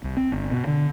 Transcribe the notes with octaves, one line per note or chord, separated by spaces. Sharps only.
C2
C4
G1
B2
D3